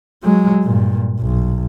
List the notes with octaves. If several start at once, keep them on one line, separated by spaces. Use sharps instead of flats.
F#3 G#3
G2 A#2
B1